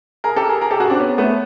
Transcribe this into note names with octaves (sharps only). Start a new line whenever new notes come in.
G#4 A#4
G4 A4
G#4 A#4
G#4 A#4
G4 A4
F#4 G#4
C4 D4
B3 C#4
A3 B3